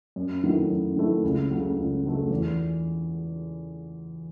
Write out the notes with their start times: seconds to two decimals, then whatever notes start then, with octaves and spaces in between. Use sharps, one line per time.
0.16 F#2
0.44 D#3 F#3 A3 E4
0.70 F#2
0.96 D#3 F#3 A3 E4
1.24 C#2
1.51 C#3 F#3 A3
1.78 C#2
2.04 C#3 F#3 A3
2.31 E2